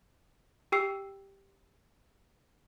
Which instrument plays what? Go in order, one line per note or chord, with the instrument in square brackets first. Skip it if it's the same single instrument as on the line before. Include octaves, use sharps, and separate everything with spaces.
[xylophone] G4 G5 E6 C7